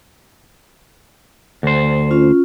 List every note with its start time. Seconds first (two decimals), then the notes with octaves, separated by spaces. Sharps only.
1.63 D2 C5
2.11 C#4 F4